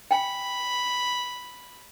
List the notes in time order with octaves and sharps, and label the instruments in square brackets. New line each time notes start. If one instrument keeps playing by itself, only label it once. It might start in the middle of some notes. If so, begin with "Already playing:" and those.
[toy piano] G5 G#5 [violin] B5